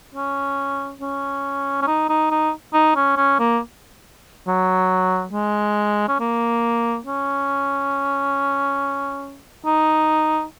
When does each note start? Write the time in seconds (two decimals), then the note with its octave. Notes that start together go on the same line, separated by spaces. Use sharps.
0.15 C#4
1.01 C#4
1.82 C#4
1.87 D#4
2.09 D#4
2.31 D#4
2.74 D#4
2.96 C#4
3.17 C#4
3.39 A#3
4.47 F#3
5.33 G#3
6.09 C#4
6.20 A#3
7.06 C#4
9.65 D#4